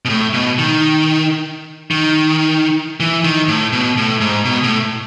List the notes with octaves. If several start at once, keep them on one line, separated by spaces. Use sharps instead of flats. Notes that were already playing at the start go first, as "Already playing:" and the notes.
B2
A2
B2
D#3
D#3
E3
D#3
A2
B2
A2
G#2
B2
A2